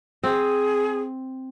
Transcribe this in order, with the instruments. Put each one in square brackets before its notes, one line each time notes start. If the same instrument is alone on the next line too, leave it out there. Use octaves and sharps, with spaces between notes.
[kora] C4 [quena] G#4